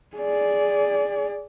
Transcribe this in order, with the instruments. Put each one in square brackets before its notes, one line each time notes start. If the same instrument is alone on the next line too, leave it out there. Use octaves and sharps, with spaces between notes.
[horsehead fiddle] G#4 D5